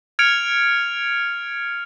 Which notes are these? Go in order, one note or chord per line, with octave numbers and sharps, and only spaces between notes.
F6 G#6 C#7 D7 F7